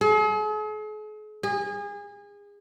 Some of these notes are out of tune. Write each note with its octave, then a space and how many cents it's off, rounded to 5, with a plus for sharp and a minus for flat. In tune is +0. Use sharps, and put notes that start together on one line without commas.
G#4 +45
G#4 -30